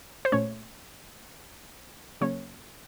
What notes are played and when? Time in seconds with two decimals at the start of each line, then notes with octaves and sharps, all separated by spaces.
0.25 C5
0.32 A#2 A3 C#4 C#5
2.21 C#3 F#3 A#3 C#4 C#5